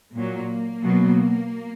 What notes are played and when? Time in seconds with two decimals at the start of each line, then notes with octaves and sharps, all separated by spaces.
0.15 A#2 F#3 A#3
0.83 B2 F#3